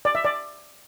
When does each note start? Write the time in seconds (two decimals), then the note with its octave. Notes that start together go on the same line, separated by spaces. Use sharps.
0.05 D5
0.15 E5
0.25 D5